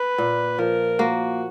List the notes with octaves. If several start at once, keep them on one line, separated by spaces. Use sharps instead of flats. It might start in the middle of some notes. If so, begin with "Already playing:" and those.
Already playing: B4
A#2
F3 A#4
A#3 F#4